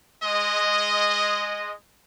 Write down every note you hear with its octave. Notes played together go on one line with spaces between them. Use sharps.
G#3 D#5